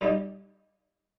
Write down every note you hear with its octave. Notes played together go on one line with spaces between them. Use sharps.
A#2 G3 D#4 G4